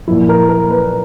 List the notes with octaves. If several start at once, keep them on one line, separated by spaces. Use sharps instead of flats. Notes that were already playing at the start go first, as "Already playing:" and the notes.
A#2 F3 E4
A#4
A#4
B4